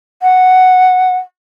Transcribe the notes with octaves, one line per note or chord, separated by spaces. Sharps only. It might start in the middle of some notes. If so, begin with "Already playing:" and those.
F#5